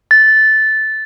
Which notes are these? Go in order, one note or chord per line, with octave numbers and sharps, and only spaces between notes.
A6